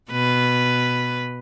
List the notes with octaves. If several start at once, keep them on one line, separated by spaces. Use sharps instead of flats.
B2 B4